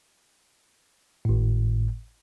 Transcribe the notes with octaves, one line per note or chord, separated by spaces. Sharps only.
G#1 A2